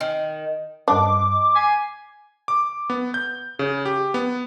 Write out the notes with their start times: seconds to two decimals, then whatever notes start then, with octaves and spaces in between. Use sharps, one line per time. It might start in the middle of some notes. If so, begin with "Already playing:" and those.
0.01 D#3
0.88 G2 G3 D4 D#5 D6
1.55 G#5 B6 C7
2.48 D6
2.90 B3
3.14 G6
3.59 C#3
3.85 G4
4.14 B3